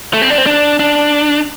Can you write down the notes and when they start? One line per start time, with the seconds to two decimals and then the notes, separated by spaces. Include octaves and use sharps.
0.13 A3
0.22 C4
0.30 D4
0.38 C4
0.46 D4
0.79 D4